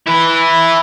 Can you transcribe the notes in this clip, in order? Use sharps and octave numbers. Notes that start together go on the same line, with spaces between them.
E4 B4